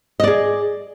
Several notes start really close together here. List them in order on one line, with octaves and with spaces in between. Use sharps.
D#5 D5 G#4